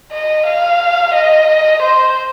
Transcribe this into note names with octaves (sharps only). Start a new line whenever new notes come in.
D#5
F5
D#5
C5